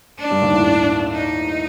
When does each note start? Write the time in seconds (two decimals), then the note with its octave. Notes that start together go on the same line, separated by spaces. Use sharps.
0.19 D4
0.31 G2 G3
0.42 D#2 D#3
0.54 A2
1.12 D#4